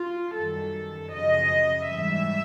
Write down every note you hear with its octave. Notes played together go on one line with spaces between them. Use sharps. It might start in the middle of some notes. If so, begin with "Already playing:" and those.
Already playing: F4
F#2 D#3 G3 A4
F#2 C#3 F3 D#5
G#2 E3 G3 E5